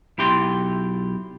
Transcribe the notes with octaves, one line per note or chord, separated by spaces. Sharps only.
B1 E4 G4 C6